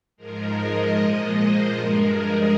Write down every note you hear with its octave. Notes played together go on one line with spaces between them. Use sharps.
G#2 F3 G#3 A#4
D#5
A#2 F3 G#3 D#5
C5
G2 F3 G#3 A#4
G#4